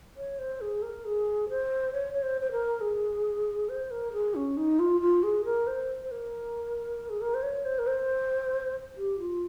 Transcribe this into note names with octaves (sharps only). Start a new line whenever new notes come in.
C#5
C5
G#4
A#4
G#4
C5
C#5
C#5
C5
C5
A#4
G#4
C5
A#4
G#4
C#4
D#4
F4
F4
G#4
A#4
C5
C5
A#4
G#4
A#4
C5
C#5
C5
A#4
C5
G4
F4